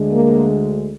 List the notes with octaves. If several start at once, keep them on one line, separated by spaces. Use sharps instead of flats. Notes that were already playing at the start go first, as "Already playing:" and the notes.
Already playing: D2 D3 G#3
A#3